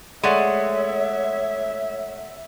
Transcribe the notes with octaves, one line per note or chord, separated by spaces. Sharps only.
G#3 A3 C#5 D5 E5 F#5